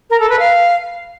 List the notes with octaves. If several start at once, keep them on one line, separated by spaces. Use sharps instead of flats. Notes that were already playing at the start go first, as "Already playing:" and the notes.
A#4
A4
B4
F5